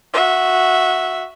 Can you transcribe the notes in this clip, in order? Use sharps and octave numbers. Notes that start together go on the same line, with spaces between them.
F#4 E5